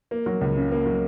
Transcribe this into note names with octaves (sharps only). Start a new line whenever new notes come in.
A#3
F#3
C#2
C#3
A#3
F#3